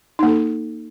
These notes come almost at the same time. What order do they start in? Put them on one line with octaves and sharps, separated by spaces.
D#4 A#3 A4